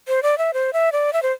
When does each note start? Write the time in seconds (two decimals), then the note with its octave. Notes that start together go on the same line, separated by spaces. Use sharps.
0.08 C5
0.23 D5
0.38 E5
0.54 C5
0.73 E5
0.92 D5
1.13 E5
1.22 C5